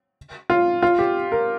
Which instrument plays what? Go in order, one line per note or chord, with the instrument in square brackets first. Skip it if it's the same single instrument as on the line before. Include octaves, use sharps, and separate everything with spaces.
[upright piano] F4
F4
G4
A#4